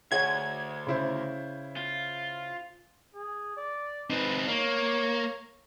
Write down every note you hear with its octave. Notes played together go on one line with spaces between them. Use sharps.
D2 G#4 C#5 F#5 G#6
C#3 E4 C5
F4
G#4
D5
C4 D#4 B4
A#3 C#5